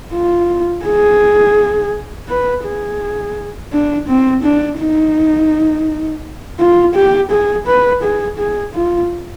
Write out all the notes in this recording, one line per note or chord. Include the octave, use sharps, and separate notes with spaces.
F4
G#4
B4
G#4
D4
C4
D4
D#4
F4
G4
G#4
B4
G#4
G#4
F4